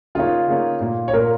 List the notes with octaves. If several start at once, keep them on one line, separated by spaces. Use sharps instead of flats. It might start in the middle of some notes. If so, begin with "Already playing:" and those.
C#3 A#3 D#4 F4 A#4 C#5
C#3 A#3 D#4 A#4 C#5
A#2 A#3 F4
C#5
A#2 A#3 F4 A#4